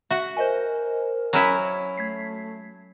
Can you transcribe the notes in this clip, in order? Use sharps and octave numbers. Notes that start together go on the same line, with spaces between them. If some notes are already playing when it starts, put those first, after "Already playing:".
F#4 E5
A#4 C5 D#5 G#5
F#3 C#4 E4
A3 G#6 B6 C7